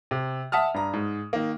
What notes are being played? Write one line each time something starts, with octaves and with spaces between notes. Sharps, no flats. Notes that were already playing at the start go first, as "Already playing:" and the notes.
C3
E5 F#5 A5 D#6 F6
G2 A#5
G#2
D#3 A#3